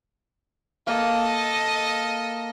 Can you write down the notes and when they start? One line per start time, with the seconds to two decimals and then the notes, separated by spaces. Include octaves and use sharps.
0.87 A#3 A4 D#5